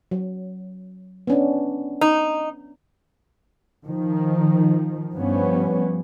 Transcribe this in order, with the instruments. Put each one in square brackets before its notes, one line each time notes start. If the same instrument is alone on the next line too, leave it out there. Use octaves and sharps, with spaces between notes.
[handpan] F#3
B3 C#4 D4
[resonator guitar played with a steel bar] D#4
[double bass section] D#3 F3
G2 F3 G3 B3 C#4